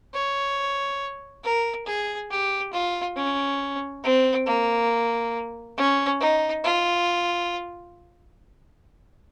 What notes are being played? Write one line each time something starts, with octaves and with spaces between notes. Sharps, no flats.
C#5
A#4
G#4
G4
F4
C#4
C4
A#3
C#4
D#4
F4